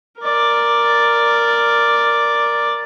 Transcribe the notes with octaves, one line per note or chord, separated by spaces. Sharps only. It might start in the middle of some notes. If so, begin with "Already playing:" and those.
A#4 D5